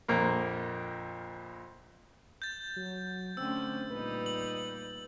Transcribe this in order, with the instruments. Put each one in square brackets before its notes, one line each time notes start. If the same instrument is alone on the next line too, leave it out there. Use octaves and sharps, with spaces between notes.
[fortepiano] A#1 F2 A#3 A#4
[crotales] G6 A6
[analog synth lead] F#3
[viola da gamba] D3 A3 C#4 [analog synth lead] C4 [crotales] E6
[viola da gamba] A#2 G3 D#4 [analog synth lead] B4
[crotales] F#7